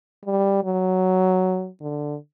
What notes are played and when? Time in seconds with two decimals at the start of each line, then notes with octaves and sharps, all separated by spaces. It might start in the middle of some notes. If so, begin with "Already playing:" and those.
0.25 G3
0.64 F#3
1.81 D3